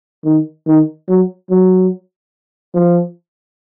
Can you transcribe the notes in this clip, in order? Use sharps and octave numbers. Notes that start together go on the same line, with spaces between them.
D#3
D#3
F#3
F#3
F3